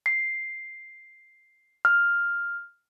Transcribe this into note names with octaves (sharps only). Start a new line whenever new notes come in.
C7
F6